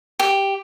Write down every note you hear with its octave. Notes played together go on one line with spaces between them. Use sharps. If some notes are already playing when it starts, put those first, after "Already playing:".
G4